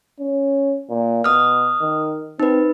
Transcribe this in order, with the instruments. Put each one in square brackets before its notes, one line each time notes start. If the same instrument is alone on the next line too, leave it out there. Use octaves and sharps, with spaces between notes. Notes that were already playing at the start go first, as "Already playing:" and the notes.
[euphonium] C#4
A#2
[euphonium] B2 [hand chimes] D#6 F6
[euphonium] D#3
[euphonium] C4 [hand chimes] D#4 B4